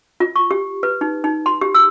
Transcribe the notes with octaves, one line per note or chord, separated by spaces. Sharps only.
F4
C#6
G4
B4
D#4
D#4
C6
G4
E6